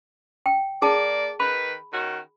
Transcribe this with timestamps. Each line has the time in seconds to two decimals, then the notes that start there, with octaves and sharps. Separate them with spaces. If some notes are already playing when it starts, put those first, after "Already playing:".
0.46 G5
0.82 A#3 G#4 D5 A5
1.40 D#3 B4 B5
1.92 D#3 C#4 F#4